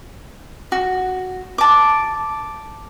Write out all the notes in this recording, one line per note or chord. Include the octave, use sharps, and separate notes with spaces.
F#4
A5 D6